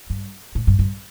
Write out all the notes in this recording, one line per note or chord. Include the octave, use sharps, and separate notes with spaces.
G2
A2
G2
G2